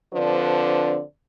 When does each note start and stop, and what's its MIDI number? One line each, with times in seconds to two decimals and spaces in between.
0.14 1.00 50
0.14 1.00 53
0.14 1.00 60
0.14 1.00 62
0.14 1.00 71
0.14 1.00 74